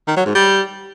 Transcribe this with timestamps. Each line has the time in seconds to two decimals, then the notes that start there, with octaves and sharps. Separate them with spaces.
0.08 D#3
0.17 F#3
0.26 G#2
0.35 G3